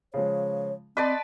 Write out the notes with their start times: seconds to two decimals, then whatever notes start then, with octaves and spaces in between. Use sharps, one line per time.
0.14 C#3 F3 G#3 C#5
0.97 C4 B4 D5 D#5 A5 B5 C6